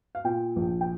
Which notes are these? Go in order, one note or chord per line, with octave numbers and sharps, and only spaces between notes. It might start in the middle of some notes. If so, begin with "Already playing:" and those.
F5
A#2 G5
A#1
G5